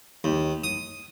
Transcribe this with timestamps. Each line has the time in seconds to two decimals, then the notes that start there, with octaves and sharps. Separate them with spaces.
0.24 D#2
0.64 D#6